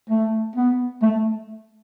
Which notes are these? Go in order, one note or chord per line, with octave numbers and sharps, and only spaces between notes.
A3
B3
A3